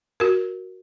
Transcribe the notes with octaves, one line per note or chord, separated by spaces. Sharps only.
F#4 A#4